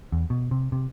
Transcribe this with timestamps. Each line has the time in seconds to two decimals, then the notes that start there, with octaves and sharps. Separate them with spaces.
0.12 E2
0.30 B2
0.51 C3
0.72 C3